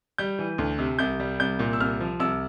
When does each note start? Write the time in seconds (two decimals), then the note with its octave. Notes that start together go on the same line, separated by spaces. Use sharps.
0.18 G3 G6
0.39 E3
0.58 D2
0.79 C3
0.99 C2 G6
1.20 G3
1.40 C2 G6
1.59 A#2
1.73 E6
1.80 C2 F6
2.00 F3
2.20 C2 E6